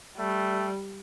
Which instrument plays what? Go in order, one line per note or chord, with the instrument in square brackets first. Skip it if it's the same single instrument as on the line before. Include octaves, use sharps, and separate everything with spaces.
[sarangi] G3 [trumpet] A3